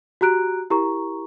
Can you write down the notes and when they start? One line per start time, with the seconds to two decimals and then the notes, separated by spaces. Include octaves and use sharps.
0.21 F#4 G4 A#5 F#6 D7
0.70 E4 G4 A#4 A#5 C#6